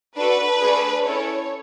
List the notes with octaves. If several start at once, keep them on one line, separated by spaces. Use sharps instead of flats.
D4 F#4 A4 B4
A3 D4 G#4
C#4 E4 A4 C#5